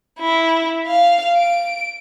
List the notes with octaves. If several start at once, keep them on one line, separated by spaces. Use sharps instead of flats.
E4
F5
D7